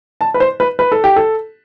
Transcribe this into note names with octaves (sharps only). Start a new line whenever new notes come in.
A5
B4
C5
B4
B4
A4
G4
A4